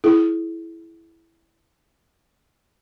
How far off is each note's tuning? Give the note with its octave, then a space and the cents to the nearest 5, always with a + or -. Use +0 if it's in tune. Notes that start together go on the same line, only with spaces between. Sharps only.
E4 +0 G#4 +35